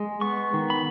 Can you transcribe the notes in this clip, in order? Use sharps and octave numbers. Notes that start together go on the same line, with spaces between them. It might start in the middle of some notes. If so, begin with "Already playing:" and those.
Already playing: G#3
B3 C#6
D#3
B5